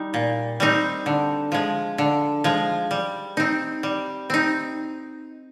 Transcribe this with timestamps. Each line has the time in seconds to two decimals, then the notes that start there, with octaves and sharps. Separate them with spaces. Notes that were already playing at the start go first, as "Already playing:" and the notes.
Already playing: G3 D#4
0.14 A#2
0.60 G3 C4 D#4
1.06 D3
1.52 F3 G#3
1.98 D3
2.44 F3 G#3
2.91 G3
3.37 C4 D#4
3.83 G3
4.30 C4 D#4